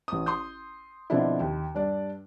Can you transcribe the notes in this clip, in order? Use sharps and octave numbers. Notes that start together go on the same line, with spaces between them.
A1 D#6
C6 D#6 G6
B2 D3 F3 C4 D4 E4
D#2
G2 D4 D5